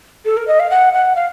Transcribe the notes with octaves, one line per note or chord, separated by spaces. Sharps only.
A4
A#4
D#5
F5
F#5
F#5
F5